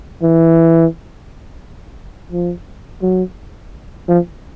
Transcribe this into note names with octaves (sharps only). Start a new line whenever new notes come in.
E3
F3
F#3
F3